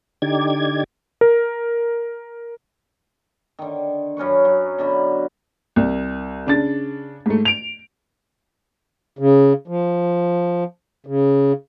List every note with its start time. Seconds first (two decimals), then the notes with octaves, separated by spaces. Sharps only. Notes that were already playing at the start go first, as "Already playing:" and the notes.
0.22 D3 D#4 G4 D5 G#6
1.21 A#4
3.59 D3 D#3
4.17 F#2 C#4 B4 C#6
4.45 F#3
4.78 B2 D3 B5
5.76 C2
6.46 C#3 D4 A6
7.26 G#2 A3
7.45 D7 F7
9.19 C#3
9.68 F3
11.06 C#3